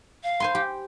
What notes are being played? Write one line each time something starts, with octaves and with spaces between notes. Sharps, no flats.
F5
C5 G#5 C6
G4